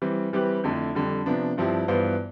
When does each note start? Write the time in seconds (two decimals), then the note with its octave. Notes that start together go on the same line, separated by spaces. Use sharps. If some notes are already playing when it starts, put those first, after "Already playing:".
0.02 E3 G3 C4
0.33 E3 G3 C4 G4 B4
0.64 F2 D3 A3 E4
0.95 F2 D3 G3
1.26 C3 F3 B3 D4
1.58 G2 F3 C4 E4 G4
1.88 G2 E3 B3 F4 C5